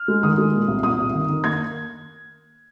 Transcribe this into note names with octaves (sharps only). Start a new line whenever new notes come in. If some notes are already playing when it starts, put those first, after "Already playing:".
Already playing: F6
G#3
D#3 D#6
G#3
A#2
C2
A#2 D#6
C2
D#3
D#3
A#3 G#6